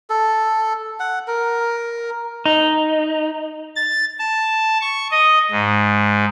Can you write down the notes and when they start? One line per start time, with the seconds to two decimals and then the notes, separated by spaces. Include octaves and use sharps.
0.10 A4
1.00 F#5
1.28 A#4
2.46 D#4
3.76 A6
4.19 A5
4.81 C#6
5.11 D#5
5.51 G#2